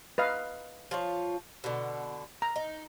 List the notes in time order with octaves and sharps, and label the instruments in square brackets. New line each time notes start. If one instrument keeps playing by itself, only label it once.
[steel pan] B4 D#5 F5
[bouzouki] F3 F4 C#5
B2 D3
[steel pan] A#5
[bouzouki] D#4